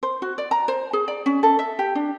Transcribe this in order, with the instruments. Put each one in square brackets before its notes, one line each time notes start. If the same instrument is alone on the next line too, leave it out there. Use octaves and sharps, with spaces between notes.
[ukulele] C5
F#4
D5
A#5
C5
G#4
D5
C#4
A4
E5
G4
D4